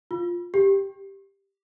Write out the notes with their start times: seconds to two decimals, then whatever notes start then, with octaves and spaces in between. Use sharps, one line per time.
0.11 F4
0.54 G4